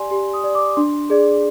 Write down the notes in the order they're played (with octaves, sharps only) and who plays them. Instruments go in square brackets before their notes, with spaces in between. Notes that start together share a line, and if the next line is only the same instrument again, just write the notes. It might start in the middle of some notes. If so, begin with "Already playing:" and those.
Already playing: [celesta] G4 D5 G#5 C6
G4 C6
D#6
D5
D6
D4 C6
G#4 D5